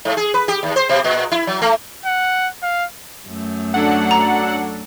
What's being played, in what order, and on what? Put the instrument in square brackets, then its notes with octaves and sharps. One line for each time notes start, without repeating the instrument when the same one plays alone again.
[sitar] G#2
G#4
B4
G4
D#2
C5
B2
A#2
E4
F#3
A3
[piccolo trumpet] F#5
F5
[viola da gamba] F#2 A3
[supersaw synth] F#3 D4 A4 [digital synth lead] F#5
[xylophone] A#5